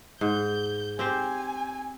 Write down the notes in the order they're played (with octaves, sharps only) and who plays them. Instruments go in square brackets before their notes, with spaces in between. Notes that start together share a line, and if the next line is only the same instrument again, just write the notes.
[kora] G#2 [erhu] G6
[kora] C4 G4 C5 [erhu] G#5